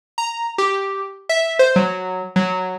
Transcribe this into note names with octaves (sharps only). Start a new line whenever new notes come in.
A#5
G4
E5
C5
F#3
F#3